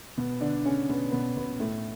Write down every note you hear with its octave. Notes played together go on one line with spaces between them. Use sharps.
B2 B3
D3 D4
C#3 C#4
B2 B3
B2 B3
B2 B3
A2 A3